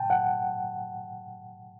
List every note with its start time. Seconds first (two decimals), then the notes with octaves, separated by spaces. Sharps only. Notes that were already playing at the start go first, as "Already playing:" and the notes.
Already playing: G5 A5
0.10 F#5